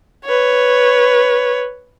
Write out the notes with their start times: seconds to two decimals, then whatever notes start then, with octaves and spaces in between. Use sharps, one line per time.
0.25 B4 C#5